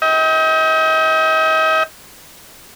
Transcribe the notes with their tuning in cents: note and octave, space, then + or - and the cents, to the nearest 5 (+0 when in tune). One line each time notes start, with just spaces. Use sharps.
D#5 +40 G5 +0